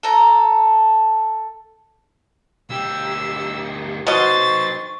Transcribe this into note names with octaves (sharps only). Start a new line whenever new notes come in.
A4 A#5
D2 G4 E6
B2 D#4 B4 C5 D#5 C#6 A6